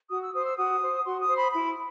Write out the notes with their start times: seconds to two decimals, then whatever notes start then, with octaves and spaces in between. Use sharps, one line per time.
0.09 F#4 D#6
0.22 E6
0.34 C5 D#6
0.46 E6
0.57 F#4 D#6
0.81 C5
1.04 F#4 C6
1.20 D#6
1.28 C5
1.36 B5
1.52 E4 B5